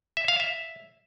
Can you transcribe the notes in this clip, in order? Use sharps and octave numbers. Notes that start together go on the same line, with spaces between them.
E5
F5
E5